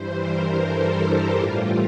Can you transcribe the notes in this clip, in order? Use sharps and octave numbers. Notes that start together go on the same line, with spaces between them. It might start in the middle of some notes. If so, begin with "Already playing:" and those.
Already playing: G2 E3 G3 C5
A#4
A4
G4
A2 E3 G3 F4